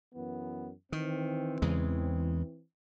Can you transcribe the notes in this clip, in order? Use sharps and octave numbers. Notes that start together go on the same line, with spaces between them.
F#2 E3 B3
D#3 E3 C4
E2 C#3 G#3